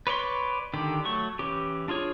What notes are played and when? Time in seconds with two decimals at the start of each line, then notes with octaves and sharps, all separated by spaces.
0.07 B4 C#5 D5 C6
0.74 D3 D#3 G4
1.05 F#3 A3 C#6
1.39 E3 C#4 G4
1.88 D4 F4 G#4 C#5